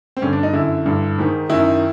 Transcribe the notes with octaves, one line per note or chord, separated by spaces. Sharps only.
C4
G2 D3 C#4
D4
D#4
F#2 D3 E4
G2 D3
G#2 D#3
F#2 D#3 E4